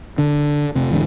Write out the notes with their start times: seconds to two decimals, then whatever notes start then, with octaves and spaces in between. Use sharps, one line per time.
0.18 D3
0.75 F1 C3
0.91 E2 G#2 D3